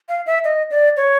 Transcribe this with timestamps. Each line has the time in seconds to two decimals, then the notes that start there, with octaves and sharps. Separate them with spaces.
0.09 F5
0.26 E5
0.44 D#5
0.71 D5
0.97 C#5